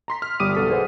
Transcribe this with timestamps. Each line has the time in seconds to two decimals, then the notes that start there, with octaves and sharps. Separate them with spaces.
0.08 A#5 C6 B6
0.22 F6
0.40 G1 G3 D6 D#6 D#7
0.55 B1 B3 A4 C#6 B6
0.70 G#4 B4 C5 D#5 F#5